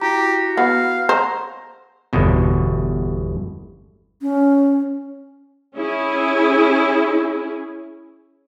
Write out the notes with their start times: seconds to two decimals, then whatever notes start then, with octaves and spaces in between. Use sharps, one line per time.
0.01 E4 F#4 G4 A#5
0.57 B3 F5 F#5 B5
1.09 C5 A#5 C6
2.13 G1 E2 B2
4.22 C#4
5.75 C#4 E4 G#4